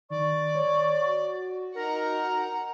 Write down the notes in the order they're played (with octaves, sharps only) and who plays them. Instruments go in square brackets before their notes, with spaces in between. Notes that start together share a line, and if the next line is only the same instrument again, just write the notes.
[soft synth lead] D#3 [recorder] D5 [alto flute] C#6
[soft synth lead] C#5
F#4
[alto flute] D#4 [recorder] A#4 [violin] F#5 A#5